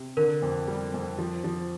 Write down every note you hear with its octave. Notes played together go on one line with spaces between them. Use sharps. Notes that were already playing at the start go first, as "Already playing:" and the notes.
Already playing: C3
D3 A#4
F2
G3
F2
F3
F3